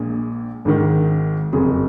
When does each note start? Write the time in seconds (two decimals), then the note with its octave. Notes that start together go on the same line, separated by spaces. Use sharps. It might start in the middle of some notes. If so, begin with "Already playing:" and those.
Already playing: A#1 A#2 G#3 G#4
0.65 G#1 G#2 D#3
1.52 F#1 F2 C3 F#3 G#4